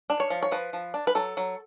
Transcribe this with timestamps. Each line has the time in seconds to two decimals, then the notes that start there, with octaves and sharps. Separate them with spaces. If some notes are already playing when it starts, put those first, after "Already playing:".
0.10 D4
0.20 C#5
0.30 F3
0.43 C#5
0.51 F3 B4
0.73 F3
0.94 D4
1.07 B4
1.15 F#3 A4
1.37 F#3